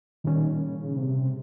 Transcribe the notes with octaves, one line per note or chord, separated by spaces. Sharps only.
A#2 D#3 G3 C#4
C#3
C3